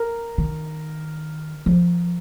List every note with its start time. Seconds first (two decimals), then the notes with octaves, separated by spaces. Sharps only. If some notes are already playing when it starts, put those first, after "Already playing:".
Already playing: A#4
0.38 D#3
1.66 F3